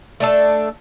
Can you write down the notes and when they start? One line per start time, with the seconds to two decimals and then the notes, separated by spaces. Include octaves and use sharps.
0.20 A3 D4 A4